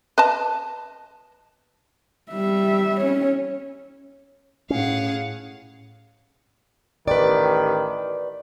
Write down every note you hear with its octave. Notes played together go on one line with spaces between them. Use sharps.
B4 D#5 A5
G3 E5
C#4 C#5
A2 C#4 G#4 F5 F#5
A1 D#3 G4 B4 D5